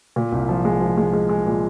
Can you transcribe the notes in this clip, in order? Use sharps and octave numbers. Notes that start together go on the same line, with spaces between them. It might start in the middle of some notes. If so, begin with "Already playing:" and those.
A#2
C2
F3
G#3
F3
G#3
G#3
G#3
A#2